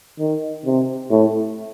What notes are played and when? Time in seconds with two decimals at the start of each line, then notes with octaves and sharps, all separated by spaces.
0.20 D#3
0.65 C3
1.11 A2